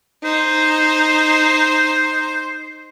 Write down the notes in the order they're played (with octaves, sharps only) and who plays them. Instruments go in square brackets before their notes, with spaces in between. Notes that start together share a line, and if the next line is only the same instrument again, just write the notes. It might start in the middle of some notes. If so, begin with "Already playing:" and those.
[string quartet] D#4 [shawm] C5